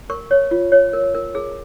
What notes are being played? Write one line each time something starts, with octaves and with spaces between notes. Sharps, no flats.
A#4 C#6
C#5
F4
C#5
A#4
A#4
G#4